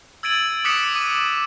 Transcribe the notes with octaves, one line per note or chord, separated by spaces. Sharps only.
E6 G#6 A6 D7 D#7 F#7
D6 D#6 F#6 B6 C#7 E7
D6 D#7